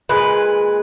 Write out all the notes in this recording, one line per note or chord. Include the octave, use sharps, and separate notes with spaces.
A#2 G#3 B4